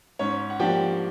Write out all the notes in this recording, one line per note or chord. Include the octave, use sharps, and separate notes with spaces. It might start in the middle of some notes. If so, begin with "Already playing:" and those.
G#2 C#4 C#5
F#5
F3 A#3 D4 G4 G5